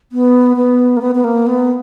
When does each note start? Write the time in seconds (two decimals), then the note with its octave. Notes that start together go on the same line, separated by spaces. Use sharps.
0.12 B3
0.57 B3
0.97 A#3
1.02 B3
1.15 B3
1.24 A#3
1.47 B3